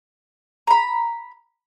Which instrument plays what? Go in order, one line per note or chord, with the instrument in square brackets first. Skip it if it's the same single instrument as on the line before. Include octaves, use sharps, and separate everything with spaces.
[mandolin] A#5 B5